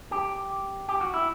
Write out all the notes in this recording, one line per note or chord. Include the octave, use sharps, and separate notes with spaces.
G4
G4
F#4
E4